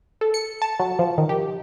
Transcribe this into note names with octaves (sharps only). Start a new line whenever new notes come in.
A4
C#7
A5
F#3
F3
D#3
G4